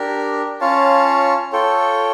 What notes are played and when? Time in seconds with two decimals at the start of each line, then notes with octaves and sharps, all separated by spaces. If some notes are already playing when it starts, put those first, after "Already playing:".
Already playing: D4 G4 A#4
0.60 C#4 F4 C#5 F5 A5
1.53 F4 A4 C#5 G5